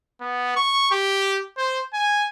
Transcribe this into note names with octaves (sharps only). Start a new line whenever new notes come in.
B3
C#6
G4
C5
G#5